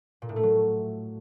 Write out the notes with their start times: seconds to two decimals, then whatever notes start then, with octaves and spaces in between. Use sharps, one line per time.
0.22 A#2
0.29 A2
0.36 A3
0.43 F#3